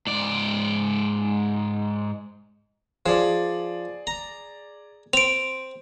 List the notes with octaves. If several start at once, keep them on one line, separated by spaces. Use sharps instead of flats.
G#2 D5
F3 G#4 D5
A#5
C4 D7 F7